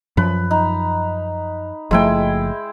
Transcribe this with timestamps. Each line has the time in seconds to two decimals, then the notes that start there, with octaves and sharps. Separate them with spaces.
0.17 F#2 F3 B4
0.51 D#4
1.91 F#1 F3 G#3 A3 E4 G5